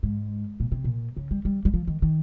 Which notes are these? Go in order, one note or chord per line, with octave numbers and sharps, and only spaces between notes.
G#2
A#2
C3
A#2
C#3
G3
G3
G3
F3
D#3
D#3